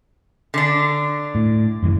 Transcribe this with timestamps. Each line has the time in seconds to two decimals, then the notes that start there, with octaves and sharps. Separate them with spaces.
0.54 D3 D4
1.35 A2
1.83 G#1 F#2 E3